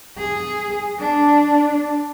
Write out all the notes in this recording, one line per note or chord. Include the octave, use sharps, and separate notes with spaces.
G#4
D4